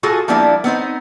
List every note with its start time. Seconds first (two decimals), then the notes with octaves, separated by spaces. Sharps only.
0.03 F4 F#4 G#4 A4
0.28 F3 G3 A#3 B3 D4 E4
0.64 B3 C4 D#4 C5